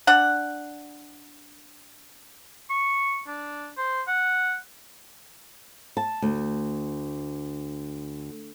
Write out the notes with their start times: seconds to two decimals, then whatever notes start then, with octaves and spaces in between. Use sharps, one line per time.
0.07 D4 F#5
2.70 C#6
3.28 D4
3.78 C5
4.08 F#5
5.97 A5
6.22 D2